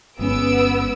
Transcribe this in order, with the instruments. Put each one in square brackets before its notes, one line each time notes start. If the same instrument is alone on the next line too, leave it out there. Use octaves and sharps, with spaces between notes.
[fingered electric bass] G1 G#3 C#4 [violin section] B3 E6 D7